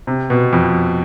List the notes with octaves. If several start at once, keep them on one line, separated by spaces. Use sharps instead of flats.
C3
B2
F2